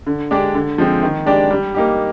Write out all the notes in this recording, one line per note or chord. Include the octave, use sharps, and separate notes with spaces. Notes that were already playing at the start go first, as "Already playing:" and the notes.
D3
G#3 D4 G4 D5
D3
F3 G#3 C4
D#3
G#3 D4 G4 D5
G3
A#3 D#4 G4